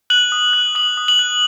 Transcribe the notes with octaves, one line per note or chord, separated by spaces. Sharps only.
F#6 F#7
D#6
F#6
D#6 F#7
D#6
F#7
F#6